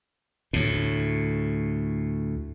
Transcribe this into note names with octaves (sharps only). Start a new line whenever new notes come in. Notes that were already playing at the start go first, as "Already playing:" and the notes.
D2 A2